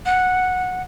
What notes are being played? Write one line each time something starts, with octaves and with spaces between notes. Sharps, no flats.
F#5